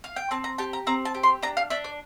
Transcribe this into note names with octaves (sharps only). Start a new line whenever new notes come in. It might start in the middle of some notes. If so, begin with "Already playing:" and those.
F5
G5
C4 A5
A#5
G4 A5
A#5
C4 A#5
A5
G4
C6
D4 A#5
F5
D4 E5
D5